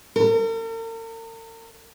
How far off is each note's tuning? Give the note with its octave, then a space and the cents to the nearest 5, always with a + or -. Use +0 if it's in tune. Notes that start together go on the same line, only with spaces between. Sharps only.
A#4 -45